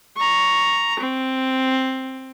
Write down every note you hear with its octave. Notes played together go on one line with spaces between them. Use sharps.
A#5 C#6
C4